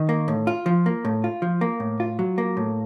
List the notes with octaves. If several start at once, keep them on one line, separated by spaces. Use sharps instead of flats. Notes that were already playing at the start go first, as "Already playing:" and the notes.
Already playing: D#3
A#3
A2
F4
F3
A#3
A2
F4
F3
A#3
A2
F4
F#3
A#3
A2